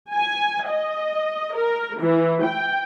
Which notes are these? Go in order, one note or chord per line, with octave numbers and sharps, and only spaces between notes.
G#5
D#5
A#4
E3
G5